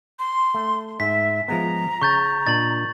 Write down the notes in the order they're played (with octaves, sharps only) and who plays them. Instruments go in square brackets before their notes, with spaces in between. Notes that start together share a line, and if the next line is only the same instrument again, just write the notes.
[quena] C6
[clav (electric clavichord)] A3
[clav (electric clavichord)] G#2 [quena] E5 [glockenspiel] B6
[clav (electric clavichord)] F3 G#3 B3 [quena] A#5
[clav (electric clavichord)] C#3 [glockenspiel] C#6 G6 A6
[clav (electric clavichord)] A#2 D4 D#5 [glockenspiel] A6 F#7